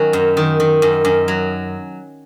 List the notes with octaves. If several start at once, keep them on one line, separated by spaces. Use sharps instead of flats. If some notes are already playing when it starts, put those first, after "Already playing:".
Already playing: D#3 F#3 C#4
F#2
D#3
D#3
F#2
F#2
F#3